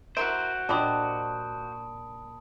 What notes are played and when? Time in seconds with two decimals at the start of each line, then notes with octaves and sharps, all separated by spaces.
0.17 E4 F#4 A#4 C5 E5 D7
0.69 A#2 D4 G4 D#5 A5 B5 D#6